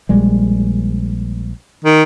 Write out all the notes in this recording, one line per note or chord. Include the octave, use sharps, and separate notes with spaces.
A#1 G3 G#3
D#3